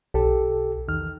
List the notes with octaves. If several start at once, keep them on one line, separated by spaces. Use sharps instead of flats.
B1 G4 A4
E2 D#3 F6